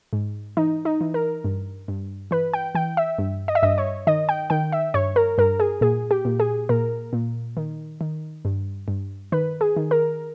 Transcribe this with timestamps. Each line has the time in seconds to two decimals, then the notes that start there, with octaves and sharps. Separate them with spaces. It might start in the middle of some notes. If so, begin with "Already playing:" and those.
0.13 G#2
0.57 E3 D#4
0.85 D#4
1.01 E3
1.14 A#4
1.44 G2
1.88 G2
2.31 E3 B4
2.54 G5
2.75 E3 G5
2.97 E5
3.18 G2
3.48 D#5
3.55 E5
3.63 G2 D#5
3.78 C#5
4.07 D#3 D#5
4.29 G5
4.50 D#3 G5
4.73 E5
4.94 G2 C#5
5.16 A#4
5.38 G2 A#4
5.60 G#4
5.81 A#2 G#4
6.11 G4
6.25 A#2
6.40 G#4
6.69 A#2 A#4
7.13 A#2
7.57 D#3
8.01 D#3
8.45 G2
8.88 G2
9.32 D#3 B4
9.61 G#4
9.77 D#3
9.91 A#4